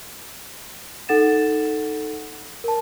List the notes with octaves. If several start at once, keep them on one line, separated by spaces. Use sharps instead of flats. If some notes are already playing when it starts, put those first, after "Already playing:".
D#4 A4 F#5 A6 E7
A#4 A5